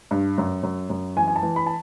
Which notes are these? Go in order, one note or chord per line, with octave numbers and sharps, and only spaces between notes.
G2
F#2
F#2
F#2
E3 G#5
G#5
A5
E3
B5
A5